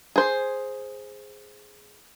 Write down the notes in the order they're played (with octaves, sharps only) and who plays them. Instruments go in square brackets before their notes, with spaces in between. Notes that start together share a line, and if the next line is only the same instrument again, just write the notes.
[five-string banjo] G#4 C5